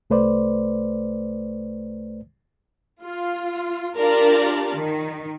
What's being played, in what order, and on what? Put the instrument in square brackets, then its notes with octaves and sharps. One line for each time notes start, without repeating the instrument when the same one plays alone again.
[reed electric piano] C2 A3 B4 C5 D5
[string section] F4
D4 F4 G4 A#4 D5 A5
D#3